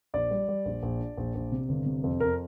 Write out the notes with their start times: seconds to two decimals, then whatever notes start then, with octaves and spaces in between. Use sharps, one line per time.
0.14 A#1 D5
0.31 G3
0.49 G3
0.65 A#1
0.83 A#1
1.00 D4
1.17 A#1
1.35 A#1
1.52 C3
1.69 G1
1.86 C3
2.04 F2
2.20 F2 A#4